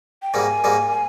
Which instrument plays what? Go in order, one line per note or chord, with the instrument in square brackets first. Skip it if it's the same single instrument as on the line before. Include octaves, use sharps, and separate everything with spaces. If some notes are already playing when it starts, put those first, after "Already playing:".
[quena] G5
[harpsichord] G#2 D#3 G3 A#3 [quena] G#5
[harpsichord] G#2 D#3 G3 A#3